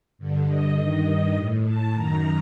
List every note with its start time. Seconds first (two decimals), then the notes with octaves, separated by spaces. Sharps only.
0.18 G2 D3
0.48 D#5
0.77 G2 D#3
1.07 D#5
1.36 A2
1.65 A5
1.94 F#2 D#3 A#5